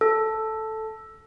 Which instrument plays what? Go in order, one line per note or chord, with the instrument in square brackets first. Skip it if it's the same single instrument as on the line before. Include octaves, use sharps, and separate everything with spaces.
[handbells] A4